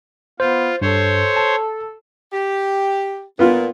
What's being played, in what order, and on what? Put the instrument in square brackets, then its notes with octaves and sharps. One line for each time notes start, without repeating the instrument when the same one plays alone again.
[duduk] B3 [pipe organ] F4 [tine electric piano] C5
[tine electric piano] G2 [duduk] A4 [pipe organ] C5 C#5
[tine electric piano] A5
[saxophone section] G4
[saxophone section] A#2 [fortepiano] B3 F4